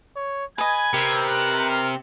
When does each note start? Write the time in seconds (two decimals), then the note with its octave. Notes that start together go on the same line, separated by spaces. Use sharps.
0.16 C#5
0.58 B4 D#5 G#5 G#6
0.94 C3 A#4
1.29 F#6
1.69 F6